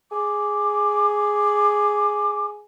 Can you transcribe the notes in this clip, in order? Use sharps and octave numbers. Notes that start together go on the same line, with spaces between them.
G#4 D6